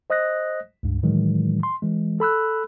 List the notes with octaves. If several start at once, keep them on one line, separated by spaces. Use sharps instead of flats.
C5 D#5 D#6 F#6 A#6
C#2 G2
A2 D#3 E3 F#3 G#3
C6
E3 G#3
A4 B5 E6 F#6